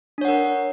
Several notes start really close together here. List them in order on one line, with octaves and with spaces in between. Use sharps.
D4 C#5 F#5 A#4